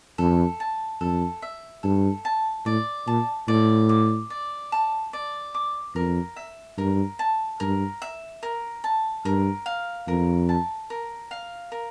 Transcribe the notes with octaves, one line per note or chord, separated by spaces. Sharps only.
F2 A4
A5
F2 A4
E5
G2 A4
A5
A2 D5
A#2 A5
A2 D5
D6
D5
A5
D5
D6
F2 A#4
E5
G2 A#4
A5
G2 A#4
E5
A#4
A5
G2 A#4
F5
F2 A#4
A5
A#4
F5
A#4